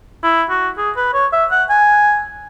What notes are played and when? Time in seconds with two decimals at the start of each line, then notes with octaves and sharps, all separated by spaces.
0.24 E4
0.50 F#4
0.78 G#4
0.96 B4
1.14 C#5
1.33 E5
1.51 F#5
1.70 G#5